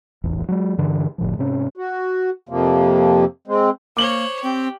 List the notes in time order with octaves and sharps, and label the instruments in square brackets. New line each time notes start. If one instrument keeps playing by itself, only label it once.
[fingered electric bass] D#1 A1 E2
F#3 G#3
G2 D3 E3
F1 A2 D3 F3
G#2 C3 C#4
[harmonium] F#4
F2 C3 F3 A#3
G#3 C4
[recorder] A#3 [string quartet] C5 C#5 [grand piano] D6 F#7 G7
[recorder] C4 [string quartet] G4